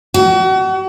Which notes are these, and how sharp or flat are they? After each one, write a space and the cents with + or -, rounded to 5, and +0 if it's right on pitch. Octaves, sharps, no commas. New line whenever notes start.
F#4 +35